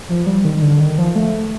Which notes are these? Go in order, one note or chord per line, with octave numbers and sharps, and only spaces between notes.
F3
G3
D#3
D3
D#3
F3
A3